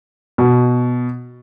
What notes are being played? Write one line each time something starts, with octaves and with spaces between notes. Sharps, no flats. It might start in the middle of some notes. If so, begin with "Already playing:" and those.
B2